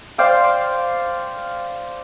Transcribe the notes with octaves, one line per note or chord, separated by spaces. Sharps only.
C5 D5 F5 G5